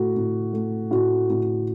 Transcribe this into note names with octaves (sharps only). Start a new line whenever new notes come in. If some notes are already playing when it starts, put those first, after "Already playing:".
Already playing: A2 A3 F#4
A2
A3
A2 F#4
A2